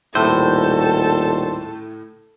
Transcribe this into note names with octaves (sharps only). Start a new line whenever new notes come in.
D#1 A2 A4 C5